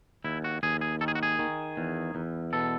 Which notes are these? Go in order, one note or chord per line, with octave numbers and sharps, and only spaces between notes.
D#2 E4
F#4
D#2 G#4
G#4
D#3 A4
G#4
F#4
G#4
D#3
E2
E2
B2 A4